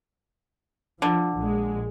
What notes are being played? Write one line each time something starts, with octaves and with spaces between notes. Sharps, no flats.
D3 F3
A#1 G#3